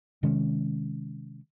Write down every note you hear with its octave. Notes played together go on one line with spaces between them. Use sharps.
C3 D#3 G#3 C#4